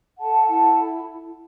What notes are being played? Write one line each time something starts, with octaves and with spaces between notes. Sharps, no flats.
A4 F#5 A5
E4 F#5 A5